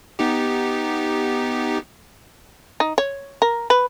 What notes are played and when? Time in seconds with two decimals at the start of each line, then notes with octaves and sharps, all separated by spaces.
0.19 B3 D#4 G4
2.80 D#4
2.98 C#5
3.42 A#4
3.70 B4